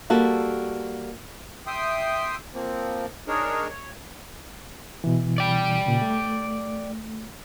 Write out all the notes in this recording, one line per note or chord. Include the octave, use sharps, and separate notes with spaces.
G3 A#3 F#4 G4 A4
E5 G5 C6 D#6
F3 A#3 C4
D4 D#4 G#4 A#4 C#5
C#5
B2 E3
D5 G5
A#2 C#3
A3